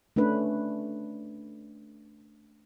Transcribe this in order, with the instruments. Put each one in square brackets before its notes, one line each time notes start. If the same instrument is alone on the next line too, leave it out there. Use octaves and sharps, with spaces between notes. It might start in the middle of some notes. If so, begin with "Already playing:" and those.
[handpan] A3 C#4 D4 B4